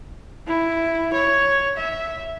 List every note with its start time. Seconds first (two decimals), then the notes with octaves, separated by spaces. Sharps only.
0.47 E4
1.14 C#5
1.77 E5